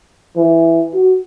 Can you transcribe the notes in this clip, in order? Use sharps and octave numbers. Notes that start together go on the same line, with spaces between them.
E3
F#4